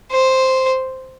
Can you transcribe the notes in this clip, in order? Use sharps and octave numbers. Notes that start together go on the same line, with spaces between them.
C5